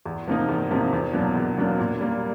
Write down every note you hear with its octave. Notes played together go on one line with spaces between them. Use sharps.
E2
C3 F3 A#3 D#4
E2
C3 F3 A#3 D#4
E2
B2 F#3 A#3 D4
E2
B2 F#3 A#3 D4
A#2
G3 A#3